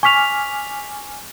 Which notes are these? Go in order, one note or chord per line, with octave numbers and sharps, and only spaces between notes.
G#5 C#6 D6 F6 B6 F7